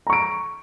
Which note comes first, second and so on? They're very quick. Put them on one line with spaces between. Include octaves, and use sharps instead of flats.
A#5 C#6 D7